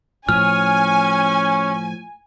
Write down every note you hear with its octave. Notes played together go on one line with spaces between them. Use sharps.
A2 F3 C#4 G#5 F6